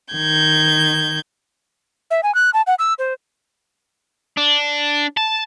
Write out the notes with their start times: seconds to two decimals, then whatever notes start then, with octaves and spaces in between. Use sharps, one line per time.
0.12 D#3 G6 G#6
2.11 E5
2.23 G#5
2.35 F#6
2.54 A5
2.67 F#5
2.79 E6
2.99 C5
4.37 D4
5.17 A5